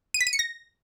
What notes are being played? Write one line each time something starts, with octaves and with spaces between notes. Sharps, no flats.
D#7
B6
D#7
C#7
A#6